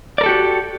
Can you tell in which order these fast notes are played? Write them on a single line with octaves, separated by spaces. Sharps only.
D5 A#4 A4 G4 F#4